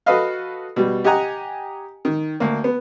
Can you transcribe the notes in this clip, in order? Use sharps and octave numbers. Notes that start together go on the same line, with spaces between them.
F#4 A4 B4 D#5 F5
B2 G3
G4 D#5 F#5 G#5 A#5
D#3
D2 A#3
B3